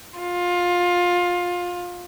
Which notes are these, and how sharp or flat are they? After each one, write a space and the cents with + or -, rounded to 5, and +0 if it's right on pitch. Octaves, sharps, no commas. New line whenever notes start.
F4 +20